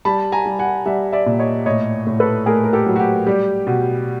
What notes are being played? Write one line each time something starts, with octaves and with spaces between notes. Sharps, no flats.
G3 A5 B5
G#5 A#5
G3
F#5 G#5
G3 E5 F#5
D5 E5
A#2
C#5 D#5
A2 C#5 D#5
A2
A4 B4
A3 G#4 A#4
A#4
G4 A4
F#3
F#4
G4
G3
B2